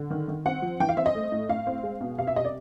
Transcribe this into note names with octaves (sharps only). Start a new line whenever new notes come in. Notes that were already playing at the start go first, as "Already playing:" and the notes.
Already playing: D3
D#3
D#3
C4 F#5
F3
E3 G5
F5
C4 E5
D#5
A3
A2
A2 F5
C4
G#3
B2
C3 F5
E5
C3 D#5
D5